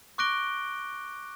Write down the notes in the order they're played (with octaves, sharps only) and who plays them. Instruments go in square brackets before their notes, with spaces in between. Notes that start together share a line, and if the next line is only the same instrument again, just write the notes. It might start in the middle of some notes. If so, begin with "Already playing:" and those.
[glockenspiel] C#6 D6 F#6 A#6 D7 G7